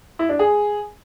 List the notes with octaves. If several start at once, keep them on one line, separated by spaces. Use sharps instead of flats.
E4
D4
G#4